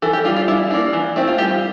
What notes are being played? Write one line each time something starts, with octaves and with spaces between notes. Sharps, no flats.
E3 A4
G4
G3 D4 F4
F4
G3 E4
A#3 D4
E3
A3 C4 E4
F4
G3 G4